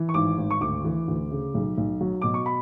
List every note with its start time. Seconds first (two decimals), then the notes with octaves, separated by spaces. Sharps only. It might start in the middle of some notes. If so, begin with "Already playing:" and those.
Already playing: E3
0.09 C#6
0.14 G#1 D6
0.38 G#1
0.51 C#6
0.61 D2 D6
0.85 E3
1.08 D2
1.31 C#3
1.54 B1
1.77 B1
2.01 F#3
2.22 B2 D6
2.34 C#6
2.46 B5